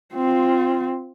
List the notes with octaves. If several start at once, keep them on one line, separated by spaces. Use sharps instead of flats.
C4 F4